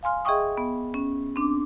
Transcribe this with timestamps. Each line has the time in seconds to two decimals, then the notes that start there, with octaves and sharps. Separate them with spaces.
0.03 F5 G#5 C6 F6
0.25 G#4 D#5 E5 G5 C#6 D#6
0.58 B3
0.94 C#4
1.36 C4 D4 D6